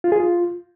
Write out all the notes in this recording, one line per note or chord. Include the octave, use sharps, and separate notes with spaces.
F4
G#4
F4